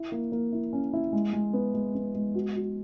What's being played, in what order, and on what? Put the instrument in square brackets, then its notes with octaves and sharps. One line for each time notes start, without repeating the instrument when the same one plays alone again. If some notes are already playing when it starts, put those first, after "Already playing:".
Already playing: [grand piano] E4
A#3
A#3
E4
C#4
E4
G#3
G#3
B3
G#3
B3
G#3
F#4
F#4